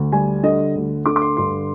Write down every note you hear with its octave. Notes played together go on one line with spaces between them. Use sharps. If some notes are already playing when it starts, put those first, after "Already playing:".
Already playing: D2
G3 G#5
D3 D#5
D2
D3 D6
D6
C6
G2 C6